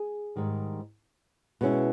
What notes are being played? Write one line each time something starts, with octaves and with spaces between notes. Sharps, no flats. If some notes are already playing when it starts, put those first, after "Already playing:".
Already playing: G#4
G#2 D#3 G3
B2 G#3 C#4 E4